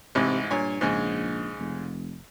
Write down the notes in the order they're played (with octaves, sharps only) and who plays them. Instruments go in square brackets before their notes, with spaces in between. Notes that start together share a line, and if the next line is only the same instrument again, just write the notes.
[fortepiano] A1 G#2 E4 [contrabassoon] C3
[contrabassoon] G2 [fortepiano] A#2 C#5 G#5
[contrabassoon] A#1 [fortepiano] G#2 C#3 G#3
[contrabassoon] F1